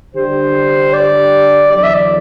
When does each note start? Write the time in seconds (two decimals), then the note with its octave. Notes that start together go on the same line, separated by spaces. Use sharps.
0.15 D3 G3 D4 G4 C5
0.93 D5
1.72 E2 D3 F#3 D5
1.83 E5
1.94 D5